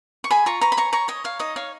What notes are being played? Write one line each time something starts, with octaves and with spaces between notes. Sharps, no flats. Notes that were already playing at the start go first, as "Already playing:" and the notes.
C#6
G#4 G#5 B5
F4 A#5 C#6
B4 A#5 C#6
B5
C#5 A#5 C#6
C#5 A#5 C#6
C#5 D#5
C#5 F5
D#4 D#5
C#5 F5